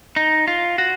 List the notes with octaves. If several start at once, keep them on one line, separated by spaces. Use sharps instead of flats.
D#4
F4
F#4